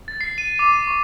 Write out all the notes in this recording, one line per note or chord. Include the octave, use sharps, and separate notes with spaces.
A6
C7
D#7
D6
D#7
C#6